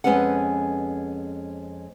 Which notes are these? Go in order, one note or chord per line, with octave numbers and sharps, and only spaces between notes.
F2 G#3 B3 C#4 B4 F#5